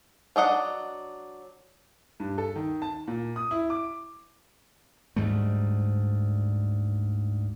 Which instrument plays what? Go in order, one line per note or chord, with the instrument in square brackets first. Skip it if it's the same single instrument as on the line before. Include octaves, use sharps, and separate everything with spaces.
[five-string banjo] F#3 D4 D#5 F#5
[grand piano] G2
A4
D#3
A5
A#2
D#6
E4
D6
[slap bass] D2 G#2 G3 A3